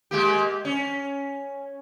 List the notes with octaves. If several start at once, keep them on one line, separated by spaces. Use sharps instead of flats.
G#3 A#3 G4
C#4